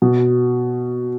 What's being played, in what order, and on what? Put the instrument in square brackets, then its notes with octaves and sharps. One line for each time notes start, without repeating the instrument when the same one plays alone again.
[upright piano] B2